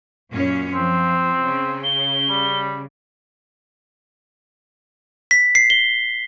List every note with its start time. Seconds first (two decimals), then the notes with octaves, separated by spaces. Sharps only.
0.31 F#2 A#2 C#4
0.74 F3 C4
1.43 C#3
1.84 G7
2.29 G3
5.31 B6
5.55 C7
5.70 G7